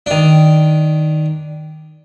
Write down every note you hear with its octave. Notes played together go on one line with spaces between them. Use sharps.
D#3 D4